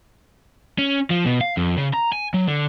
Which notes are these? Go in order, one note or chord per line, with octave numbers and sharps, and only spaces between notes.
C#4
F3
B2
F5
F2
C#3
A#5
G#5
F#3
D3